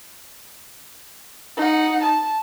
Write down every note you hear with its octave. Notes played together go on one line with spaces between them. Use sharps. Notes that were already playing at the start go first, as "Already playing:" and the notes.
D#4 F#5
A5